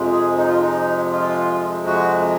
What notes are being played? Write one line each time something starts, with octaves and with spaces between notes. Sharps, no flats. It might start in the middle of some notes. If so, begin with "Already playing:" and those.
Already playing: F2 C3 F3 G#3
G#4
D#4
F4
D#4
F4
F#4